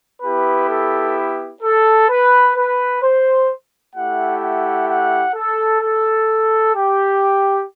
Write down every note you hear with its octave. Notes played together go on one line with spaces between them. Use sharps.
B3 E4 G4 B4
A4
A4
B4
B4
C5
A3 E4 G4 F#5
F#5
F#5
A4
A4
G4